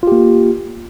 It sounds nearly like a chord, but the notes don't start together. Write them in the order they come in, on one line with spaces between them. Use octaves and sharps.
F4 G4 A#3